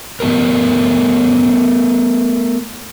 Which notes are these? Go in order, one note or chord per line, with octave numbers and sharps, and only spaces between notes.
A3 B3 G4 A#4